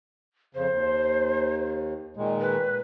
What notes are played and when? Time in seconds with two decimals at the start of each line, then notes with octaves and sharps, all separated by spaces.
0.55 F2 C#3 C5
0.71 D#2
2.17 A#2 D#3 G#3
2.41 B4